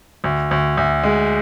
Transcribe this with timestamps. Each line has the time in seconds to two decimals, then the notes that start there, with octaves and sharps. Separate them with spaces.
0.24 D2
0.51 D2
0.77 D2
1.03 G#3